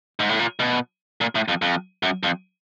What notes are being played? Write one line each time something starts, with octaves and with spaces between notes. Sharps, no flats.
G#2
A2
A#2
B2
A#2
A2
F2
F2
F#2
F2